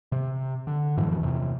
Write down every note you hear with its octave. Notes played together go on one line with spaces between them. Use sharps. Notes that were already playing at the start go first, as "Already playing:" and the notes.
C3
D3
F#2 A2 E3 F3
E2 C3